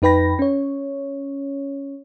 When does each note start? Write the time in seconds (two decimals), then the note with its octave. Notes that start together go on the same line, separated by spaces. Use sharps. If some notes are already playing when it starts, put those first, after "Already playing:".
0.02 F2 D#4 B4 G5 B5 A#6
0.39 C#4 C#5